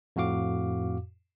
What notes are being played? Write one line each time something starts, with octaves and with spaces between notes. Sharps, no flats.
F2 A2 F#4 F5 D6